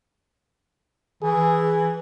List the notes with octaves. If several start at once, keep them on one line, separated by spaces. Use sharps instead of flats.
E3 G#4